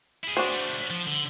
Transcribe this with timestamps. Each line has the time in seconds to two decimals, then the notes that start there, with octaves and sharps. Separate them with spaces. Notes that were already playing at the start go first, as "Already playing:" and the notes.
0.24 E4 G#4
0.37 D4 F#4 C5
0.52 G3 A3
0.90 F3
1.07 D3